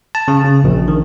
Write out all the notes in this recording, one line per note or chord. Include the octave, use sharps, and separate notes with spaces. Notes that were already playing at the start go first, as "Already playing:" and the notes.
A5
C#3
C#3
A#1
D#3